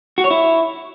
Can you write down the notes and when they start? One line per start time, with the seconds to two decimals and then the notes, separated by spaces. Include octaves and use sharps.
0.18 F#4
0.24 C#5
0.31 E4